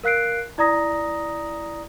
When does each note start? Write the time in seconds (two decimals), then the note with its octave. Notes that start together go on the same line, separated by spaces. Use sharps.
0.03 A#4 F5 F#6 C7 D7
0.58 E4 D5 A#5 D#6 A#6